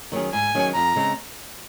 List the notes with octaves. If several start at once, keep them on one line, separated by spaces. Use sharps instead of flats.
D#3 F#3 C#4 G#4
G#2 G#5
D#3 F#3 C#4 G#4
F2 A#5
C#3 G#3 C4